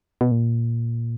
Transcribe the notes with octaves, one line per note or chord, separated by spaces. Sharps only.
B2
A#2